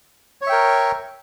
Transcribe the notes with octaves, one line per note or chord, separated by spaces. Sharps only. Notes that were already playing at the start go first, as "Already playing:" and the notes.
A#4 C#5 E5 G5 C#6